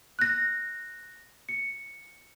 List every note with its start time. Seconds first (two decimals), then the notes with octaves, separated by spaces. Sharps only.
0.19 F#6 A#6
1.49 C#7